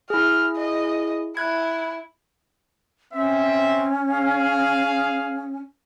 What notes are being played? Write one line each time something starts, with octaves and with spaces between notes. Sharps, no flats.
E4 G#4 F6
D#5
E4 F#6 G#6
C4 C#4 E5
G#4 F5